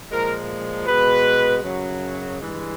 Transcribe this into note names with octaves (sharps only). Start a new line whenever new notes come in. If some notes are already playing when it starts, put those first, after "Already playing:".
A#2 F3 G#3 A#4
B2 G#3 B4
F#2 C#3 F#3
G2 E3 G#3